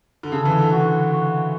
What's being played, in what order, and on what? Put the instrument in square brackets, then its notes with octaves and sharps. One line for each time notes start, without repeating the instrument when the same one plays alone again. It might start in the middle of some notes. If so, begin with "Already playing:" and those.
[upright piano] D3
[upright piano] C#3 [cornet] A4
[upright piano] E3
D3
[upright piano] D3 [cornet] F#4
[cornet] F#4